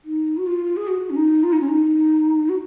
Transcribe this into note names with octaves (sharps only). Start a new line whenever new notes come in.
D#4
F#4
F4
G#4
F#4
C#4
D#4
F4
D#4
C#4
D#4
F#4